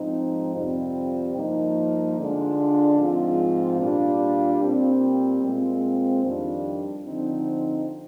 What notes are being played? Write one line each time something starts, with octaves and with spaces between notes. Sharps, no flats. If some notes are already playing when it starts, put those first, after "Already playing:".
Already playing: G#2 F3 C4 D#4
F2 C3 G3 C4 F4
G2 F3 A#3 D#4
D3 G#3 D4 F4
G#2 F3 C4 F4
A#2 G3 D4 F4
A#2 G3 C4
A#2 G#3 C4 F4
F2 D#3 G3 D4 F4
D3 F3 C4 D#4